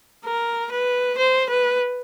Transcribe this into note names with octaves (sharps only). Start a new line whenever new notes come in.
A#4
B4
C5
B4